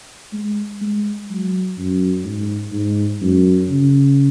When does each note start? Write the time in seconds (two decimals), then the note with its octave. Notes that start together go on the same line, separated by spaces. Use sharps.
0.33 G#3
0.81 G#3
1.30 F#3
1.78 F#2
2.25 G#2
2.73 G#2
3.22 F#2
3.69 C#3